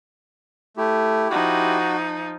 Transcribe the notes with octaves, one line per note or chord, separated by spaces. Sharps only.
A3 E4 G4
F3 D#4 F#4